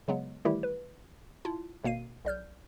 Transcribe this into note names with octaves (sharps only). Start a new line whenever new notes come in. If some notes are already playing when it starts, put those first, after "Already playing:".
C#3 F#3 G#3 B3
D#3 E3 G3 A3 E4 G4
B4
E4 F4 A5
G#1 B2 A#3 C7 D#7
B1 D5 F6 G6